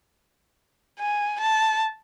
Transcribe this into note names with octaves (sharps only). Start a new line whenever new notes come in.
G#5
A5